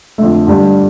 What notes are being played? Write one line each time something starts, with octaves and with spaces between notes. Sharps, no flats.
F2 D3 A3
G2 D3 G3 D4